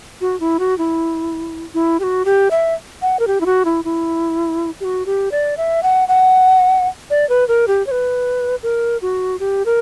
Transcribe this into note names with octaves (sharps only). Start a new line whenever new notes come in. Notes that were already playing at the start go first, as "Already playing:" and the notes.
F#4
E4
F#4
E4
E4
G4
F#4
G4
E5
F#5
A#4
G4
E4
F#4
E4
E4
G4
F#4
G4
D5
E5
F#5
F#5
D5
B4
A#4
G4
C#5
B4
A#4
F#4
G4
A#4